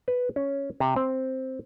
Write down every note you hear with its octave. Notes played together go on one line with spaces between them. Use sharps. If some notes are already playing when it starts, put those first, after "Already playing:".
B4
C#4
C3
C4